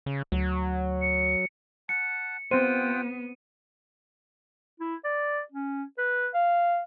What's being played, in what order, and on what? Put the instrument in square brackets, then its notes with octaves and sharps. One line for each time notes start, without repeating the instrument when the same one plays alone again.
[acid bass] C#3
[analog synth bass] D2 [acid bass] F#3
[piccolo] C#7
[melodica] F#5 A5 [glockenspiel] C#7
[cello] B3 [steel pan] C4 C5 [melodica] F4 F#5 G5 [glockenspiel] D#7
[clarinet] E4
D5
C#4
B4
F5